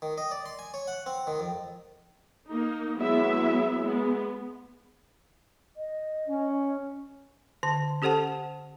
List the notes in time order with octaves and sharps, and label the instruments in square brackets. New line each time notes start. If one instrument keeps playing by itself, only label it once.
[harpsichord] D#3
D#5
D5
C6
G#5
C#5
F#5
C4
D#3
F2
[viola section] A#3 D#4
F#3 G#3 B3 E4 E5
G#3 B3
[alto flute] D#5
[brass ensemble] C#4
[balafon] D3 A5
C#4 G4 A4 C5 F#5 A5